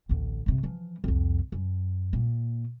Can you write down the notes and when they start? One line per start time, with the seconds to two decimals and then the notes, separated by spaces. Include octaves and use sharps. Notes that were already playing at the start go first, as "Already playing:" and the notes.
0.09 A1 D2
0.46 G#1 C3
0.63 E3 F3
1.04 C2 F2
1.52 F#2
2.13 A#2